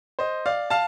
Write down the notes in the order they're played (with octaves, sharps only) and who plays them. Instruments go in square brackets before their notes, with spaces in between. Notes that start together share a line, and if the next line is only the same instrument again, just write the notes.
[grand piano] C5 D#5
D5 F5
F5 A5